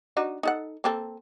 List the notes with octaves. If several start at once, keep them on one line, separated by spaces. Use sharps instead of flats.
D4 D#4 F#4
D#4 A4 F#5
A#3 C4 A4